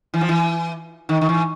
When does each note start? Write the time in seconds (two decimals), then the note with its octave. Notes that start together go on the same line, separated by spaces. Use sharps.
0.14 E3
0.21 F3
0.29 E3
1.09 D#3
1.21 D#3
1.29 E3